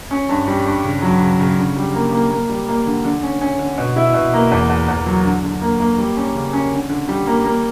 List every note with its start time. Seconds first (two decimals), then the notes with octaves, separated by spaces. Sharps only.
0.11 C#4
0.29 G2
0.47 G3
0.66 G2
0.84 C#3
1.02 F#3
1.21 C#3
1.39 C#3
1.57 D3
1.76 G3
1.95 A#3
2.13 A#3
2.30 A#3
2.49 G3
2.68 A#3
2.86 D3
3.04 D3
3.23 C#4
3.41 C#4
3.59 D3
3.78 B2
3.96 E4
4.14 B2
4.33 A#3
4.51 E2
4.70 E2
4.88 E2
5.06 F#3
5.25 D3
5.43 D3
5.61 A#3
5.80 A#3
5.98 G3
6.16 C#4
6.35 C#3
6.53 C#4
6.72 D3
6.90 D3
7.09 G3
7.27 A#3
7.45 A#3